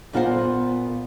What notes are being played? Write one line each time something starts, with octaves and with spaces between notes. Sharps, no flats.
A#2 B3 F4 A#4 C5 F#5